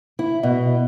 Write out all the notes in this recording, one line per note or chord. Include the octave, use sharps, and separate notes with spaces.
E4
B2